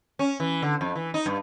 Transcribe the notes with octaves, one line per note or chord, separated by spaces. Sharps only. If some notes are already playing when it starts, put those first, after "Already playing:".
C#4
E3
D3
F2
E3
D#4
G2